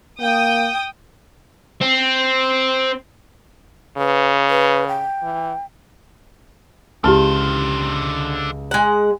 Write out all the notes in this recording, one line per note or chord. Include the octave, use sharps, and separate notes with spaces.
A#3 G5 D#6
C4
C#3 B4
B4
G5
E3
C#2 D3 E4 G4 C5 A5 F6
G#3 F#5